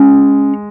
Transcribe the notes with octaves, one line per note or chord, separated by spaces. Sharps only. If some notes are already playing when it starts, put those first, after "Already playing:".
Already playing: G#3 C#4